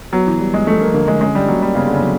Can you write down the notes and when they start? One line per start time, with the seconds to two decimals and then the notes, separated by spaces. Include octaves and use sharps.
0.13 F#3 B3
0.27 E3
0.40 G3
0.54 G#3
0.67 F3 A3
0.81 A#3
0.94 D3 A#3
1.08 G#3
1.21 G#3 C#4
1.35 G3
1.48 F#3 A#3
1.62 G3
1.75 C#3 B3
1.87 D3
1.94 C#3
2.02 F#3